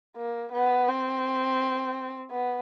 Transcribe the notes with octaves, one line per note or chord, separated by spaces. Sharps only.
A#3
B3
C4
B3